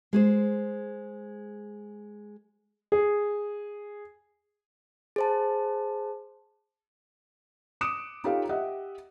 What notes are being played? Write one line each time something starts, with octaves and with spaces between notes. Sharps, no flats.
G#3 G#4 C5
G#4
G#4 C5 A5
D6 D#6 F#6 C#7 D7 E7
D#4 F4 G4 A4 C#5 F5
G4 D#5 E5 F#5